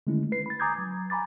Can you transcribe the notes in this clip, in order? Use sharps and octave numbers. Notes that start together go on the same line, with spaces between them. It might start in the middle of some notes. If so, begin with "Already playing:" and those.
D3 D#3 G#3 A3 C#4 E4
B4 C7
B5 A6
G#5 A#5 D6 D#6 G6 G#6
F#3
G#5 A#5 B5 D6 A6